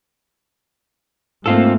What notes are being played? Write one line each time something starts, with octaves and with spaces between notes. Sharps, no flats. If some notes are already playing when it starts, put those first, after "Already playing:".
G#2 A3 A#3 C4 F4 A4